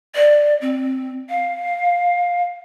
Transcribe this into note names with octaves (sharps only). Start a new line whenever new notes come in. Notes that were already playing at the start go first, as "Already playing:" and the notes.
D5
C4
F5